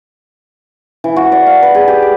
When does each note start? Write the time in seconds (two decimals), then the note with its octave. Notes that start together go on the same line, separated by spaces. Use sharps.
1.04 E3
1.16 F#4
1.32 D5
1.46 F5
1.63 B4
1.75 G#4
1.88 G4
2.02 D6